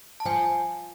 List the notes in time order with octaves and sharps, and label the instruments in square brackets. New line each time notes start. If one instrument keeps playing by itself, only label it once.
[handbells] A5
[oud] F3 [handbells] G#5